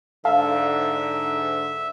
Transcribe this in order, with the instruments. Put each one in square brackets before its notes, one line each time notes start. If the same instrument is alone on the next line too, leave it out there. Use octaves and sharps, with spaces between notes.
[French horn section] G#2 D3 [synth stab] A4 F5 [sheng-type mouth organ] E5